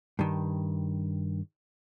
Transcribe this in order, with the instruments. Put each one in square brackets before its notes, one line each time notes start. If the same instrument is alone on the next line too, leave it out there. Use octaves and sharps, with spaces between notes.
[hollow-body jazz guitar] G2 D#3